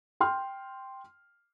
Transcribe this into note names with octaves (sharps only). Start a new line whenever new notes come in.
G5 C6 F6